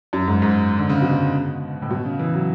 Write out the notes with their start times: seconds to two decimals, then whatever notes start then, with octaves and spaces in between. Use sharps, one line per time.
0.13 F#2
0.27 G#2
0.42 G#2
0.78 D3
0.89 C#3
1.02 B2
1.82 A2
1.91 B2
2.05 C#3
2.19 E3
2.34 F#3